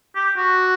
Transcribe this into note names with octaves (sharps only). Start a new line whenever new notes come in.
G4
F#4